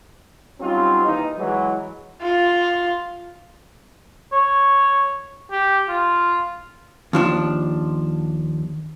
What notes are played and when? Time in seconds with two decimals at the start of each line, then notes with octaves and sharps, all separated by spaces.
0.60 F#3 G3 C4 C#4 D#4 F4
1.05 D#2 D#3 E3 D#4
1.38 E3 F#3 G#3
2.22 F4
4.32 C#5
5.52 G4
5.88 F4
7.13 D#2 F3 D4